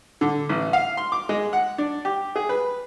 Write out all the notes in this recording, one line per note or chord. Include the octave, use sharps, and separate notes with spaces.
D3
A1
F5
C6
D6
G#3
F#5
D4
G4
G#4
B4